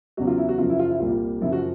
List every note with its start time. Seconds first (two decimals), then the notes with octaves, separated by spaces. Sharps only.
0.17 E2 C#3 F#3 F#4
0.27 F4
0.38 E4
0.49 F#4
0.58 F#2 C#3 F3 F4
0.70 E4
0.79 F4
0.90 E4
1.00 C2 A#2 G3 F4
1.41 F#2 C#3 F3 E4
1.52 F#4